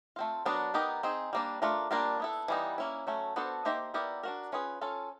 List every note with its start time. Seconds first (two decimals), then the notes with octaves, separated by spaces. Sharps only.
0.16 A3 C4 F4
0.45 F#3 B3 D4 F#4 A#4
0.74 B3 D#4 G4 A#4
1.03 C4 D#4 G#4
1.33 G3 A#3 D4
1.62 A3 D4 F4 A#4
1.91 G3 A#3 D4 F4 A#4
2.20 B3 E4 A4
2.48 E3 G3 B3 D#4
2.78 A#3 C#4 E4
3.07 F#3 A3 C#4
3.36 B3 D4 F#4 A4 C5
3.65 A#3 D#4 G4 C5 E5
3.94 B3 E4 G4 A#4 D5
4.23 D4 F#4 A#4
4.52 C#4 F4 G#4 B4
4.81 C#4 F4 A4